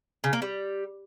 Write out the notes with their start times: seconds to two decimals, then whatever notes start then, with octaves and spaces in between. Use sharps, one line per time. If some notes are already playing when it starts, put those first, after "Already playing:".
0.24 C#3
0.33 A#3
0.42 G3